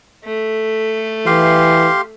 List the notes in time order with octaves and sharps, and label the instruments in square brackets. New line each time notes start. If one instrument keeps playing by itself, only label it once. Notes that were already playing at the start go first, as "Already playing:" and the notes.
[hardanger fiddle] A3
[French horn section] E3 [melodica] G4 F5 C6